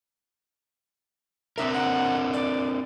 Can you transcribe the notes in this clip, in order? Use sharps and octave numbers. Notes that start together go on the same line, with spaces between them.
C4 D4 A#4 E5
F#5
D5